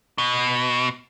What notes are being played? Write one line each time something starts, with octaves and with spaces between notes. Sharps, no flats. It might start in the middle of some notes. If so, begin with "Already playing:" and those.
B2